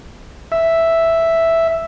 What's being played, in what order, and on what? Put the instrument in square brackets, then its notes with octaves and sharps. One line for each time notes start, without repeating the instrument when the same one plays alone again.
[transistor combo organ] E5